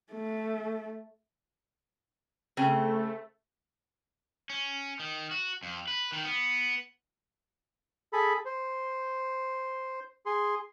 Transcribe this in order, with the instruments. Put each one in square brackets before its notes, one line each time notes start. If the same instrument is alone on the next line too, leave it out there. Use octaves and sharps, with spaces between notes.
[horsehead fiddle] A3
[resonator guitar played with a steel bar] C#3 C4 [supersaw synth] A3
[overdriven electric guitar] C#4
D#3
F#4
F2
B4
D#3
B3
[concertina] G#4 A4 B5
C5
G#4 C6